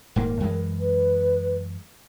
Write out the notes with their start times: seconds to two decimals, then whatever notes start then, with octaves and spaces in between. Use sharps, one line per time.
0.16 D#1 G#2 A#3 A#4
0.40 F#2 E3 G#3
0.80 B4